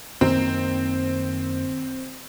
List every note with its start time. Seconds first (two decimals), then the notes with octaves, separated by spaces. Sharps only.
0.21 F#2 D#3 A#3 C4